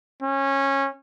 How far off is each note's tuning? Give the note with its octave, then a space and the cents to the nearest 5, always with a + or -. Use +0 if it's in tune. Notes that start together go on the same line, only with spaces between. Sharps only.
C#4 -20